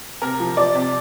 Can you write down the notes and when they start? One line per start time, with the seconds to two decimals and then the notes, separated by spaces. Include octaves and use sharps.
0.21 C3 A#4
0.40 F3
0.57 F3 D5
0.75 C3